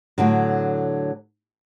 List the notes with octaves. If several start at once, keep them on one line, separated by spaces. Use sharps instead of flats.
A2 D3 F#3